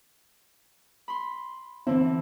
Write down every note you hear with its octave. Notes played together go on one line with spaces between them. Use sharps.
B5 C6
D3 E3 C4